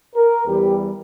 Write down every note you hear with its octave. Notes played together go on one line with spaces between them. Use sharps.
A#4
E2 E3 G3 G4